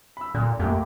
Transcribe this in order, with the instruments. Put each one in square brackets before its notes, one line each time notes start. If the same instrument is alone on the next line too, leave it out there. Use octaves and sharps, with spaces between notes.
[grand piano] B5 E6
[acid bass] A#2 [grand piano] D3
[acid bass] F#2 [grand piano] A3 A#3 G4